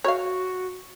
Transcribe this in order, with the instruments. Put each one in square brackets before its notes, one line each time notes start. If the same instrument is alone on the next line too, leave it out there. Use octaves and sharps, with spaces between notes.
[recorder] F#4 [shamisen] C#5 F5